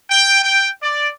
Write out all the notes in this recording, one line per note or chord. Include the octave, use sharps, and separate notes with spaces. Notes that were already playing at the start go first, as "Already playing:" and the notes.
G5
G5
D5